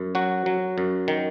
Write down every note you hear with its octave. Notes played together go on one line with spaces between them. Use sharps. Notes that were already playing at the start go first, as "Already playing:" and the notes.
Already playing: F#2
F#3 F#4
F#3
F#2
D#3